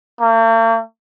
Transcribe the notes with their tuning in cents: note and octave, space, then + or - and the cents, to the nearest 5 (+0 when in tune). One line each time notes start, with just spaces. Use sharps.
A#3 -45